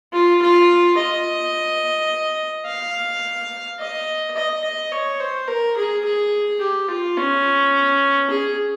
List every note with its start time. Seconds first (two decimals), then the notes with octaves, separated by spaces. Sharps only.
0.13 F4
0.42 F4
0.98 D#5
2.66 F5
3.79 D#5
4.36 D#5
4.64 D#5
4.92 C#5
5.20 C5
5.48 A#4
5.77 G#4
6.05 G#4
6.61 G4
6.89 F4
7.17 C#4
8.30 G#4